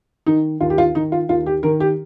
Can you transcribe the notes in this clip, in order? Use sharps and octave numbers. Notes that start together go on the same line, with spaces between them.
D#3 D#4
D#2 F4
G4
F4
D#3 D#4
F4
D#2 F4
G4
D#3 A#4
G4